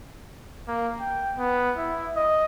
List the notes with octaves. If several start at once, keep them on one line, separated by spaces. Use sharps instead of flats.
A#3
G5
B3
E4
D#5